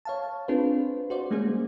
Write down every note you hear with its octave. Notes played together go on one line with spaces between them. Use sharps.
C#5 F5 A5
C4 D4 F4 G#4 B4 C5
F#4 C5 D5
G3 G#3 A#3 C#4 G#4
A#3